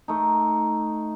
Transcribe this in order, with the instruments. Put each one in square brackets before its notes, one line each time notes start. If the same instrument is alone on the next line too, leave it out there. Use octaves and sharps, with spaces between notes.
[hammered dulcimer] A3 D#4